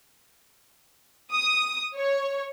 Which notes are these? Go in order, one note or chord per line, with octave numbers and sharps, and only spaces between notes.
D#6
C#5